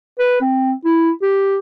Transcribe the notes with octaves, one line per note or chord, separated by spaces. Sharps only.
B4
C4
E4
G4